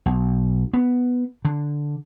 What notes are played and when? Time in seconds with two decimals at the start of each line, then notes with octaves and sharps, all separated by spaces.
0.06 B1
0.73 B3
1.45 D3